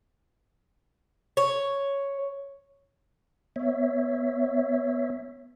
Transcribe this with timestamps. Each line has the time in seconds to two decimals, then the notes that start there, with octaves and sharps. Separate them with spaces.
1.37 C#5
3.56 B3 C#5 E5